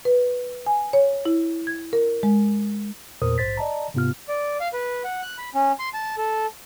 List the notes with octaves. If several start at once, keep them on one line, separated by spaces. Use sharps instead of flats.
B4
G#5
C#5
E4
G#6
A#4
G#3
E2 A#2 A#4 C5 D#6
A#1 G#2 C5 A6 B6
D5 D#5 A5 A#5
G#2 C3 B3 F4 F6
D5
F5
B4
F#5
F#6
B5
C#4
C6
A5
A4